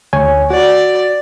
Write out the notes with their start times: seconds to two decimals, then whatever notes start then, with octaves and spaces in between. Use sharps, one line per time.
0.13 D2 C#5 G#5
0.50 F#4 D5